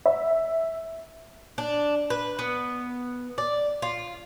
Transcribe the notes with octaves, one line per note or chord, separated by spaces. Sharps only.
E5
D4
B4
B3
D5
F4